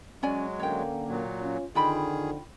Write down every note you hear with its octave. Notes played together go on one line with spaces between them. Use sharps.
F#3 G#3 C#4 D5 G#5
D3 A#3 C#4 C#5 G5
A#2 F#3
C#4 F4
F2 D3 D#3 D#4 F4 G#4 G5 B5